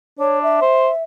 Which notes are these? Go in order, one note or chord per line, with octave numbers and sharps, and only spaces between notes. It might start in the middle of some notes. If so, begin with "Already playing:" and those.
D4 C#5
E5
C5